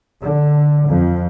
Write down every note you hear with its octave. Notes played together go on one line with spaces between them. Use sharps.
D3
F2